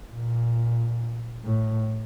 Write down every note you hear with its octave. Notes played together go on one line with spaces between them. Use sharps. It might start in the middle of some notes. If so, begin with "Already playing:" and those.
A#2
A2